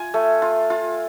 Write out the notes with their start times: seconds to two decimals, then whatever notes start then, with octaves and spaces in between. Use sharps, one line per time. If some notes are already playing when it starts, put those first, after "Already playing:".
Already playing: F4 G#5
0.14 A3
0.42 F4
0.70 F4